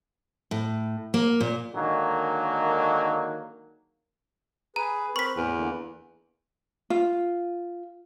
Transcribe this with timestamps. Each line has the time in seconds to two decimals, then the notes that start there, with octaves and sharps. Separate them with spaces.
0.51 A2
1.14 A#3
1.41 A#2
1.74 D3 D#3 F#3 G#3 A#3
4.76 G#4 B4 A#5
5.16 C4 A#4 B4 C#6 B6
5.37 E2 A2
5.55 D3 E3 A#3
6.90 F4